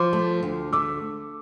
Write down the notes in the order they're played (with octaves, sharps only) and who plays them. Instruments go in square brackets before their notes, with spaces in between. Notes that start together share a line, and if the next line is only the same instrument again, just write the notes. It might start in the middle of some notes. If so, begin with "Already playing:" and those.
Already playing: [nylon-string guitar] F3 [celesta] C6 D6
[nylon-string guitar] A3
D2
[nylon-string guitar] A3 [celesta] D6 E6